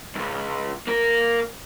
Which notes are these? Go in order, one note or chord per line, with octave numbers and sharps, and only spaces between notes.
C#2 F#2
A#3 A#4